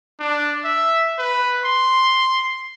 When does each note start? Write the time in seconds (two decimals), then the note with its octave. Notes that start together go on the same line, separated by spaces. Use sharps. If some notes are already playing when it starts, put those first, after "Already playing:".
0.20 D4
0.65 E5
1.18 B4
1.65 C6